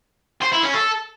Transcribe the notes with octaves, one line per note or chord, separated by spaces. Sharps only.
C5
E4
C#4
A4